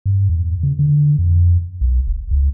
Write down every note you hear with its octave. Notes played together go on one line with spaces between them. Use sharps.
G2
E2
C#3
D3
F2
B1
D#1
C#2